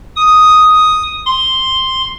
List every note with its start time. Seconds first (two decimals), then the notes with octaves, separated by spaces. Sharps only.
0.16 D#6
1.26 C6